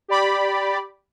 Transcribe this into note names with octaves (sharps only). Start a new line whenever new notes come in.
G4 D5 B5